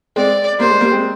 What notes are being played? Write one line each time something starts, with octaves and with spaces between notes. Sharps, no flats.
G#3 C4 D5
G3 A#3 C5
G#3
G3 A#3
G#3 C4